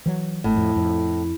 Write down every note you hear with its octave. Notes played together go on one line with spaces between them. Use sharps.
E3 F#3
G#1 A2
F2
F2